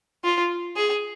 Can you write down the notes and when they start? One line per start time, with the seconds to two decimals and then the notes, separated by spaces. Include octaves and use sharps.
0.24 F4
0.76 G#4